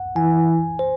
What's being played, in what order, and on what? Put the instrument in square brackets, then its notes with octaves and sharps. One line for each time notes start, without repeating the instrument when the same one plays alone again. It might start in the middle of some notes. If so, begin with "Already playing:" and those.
Already playing: [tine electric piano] F#5
[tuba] E3 [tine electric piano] G#5
[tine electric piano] C5